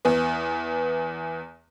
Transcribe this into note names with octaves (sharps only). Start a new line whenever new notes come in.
E2 B3